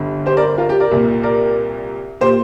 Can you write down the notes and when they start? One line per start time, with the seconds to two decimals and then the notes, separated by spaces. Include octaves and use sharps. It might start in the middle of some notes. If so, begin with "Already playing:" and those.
Already playing: G1 G2 D3
0.26 G4 C5
0.37 A#4 D5
0.58 F4 A#4
0.69 G4
0.80 A#4 D5
0.91 C2 A#2
1.23 A#4 D5
2.21 A#2 G4 C5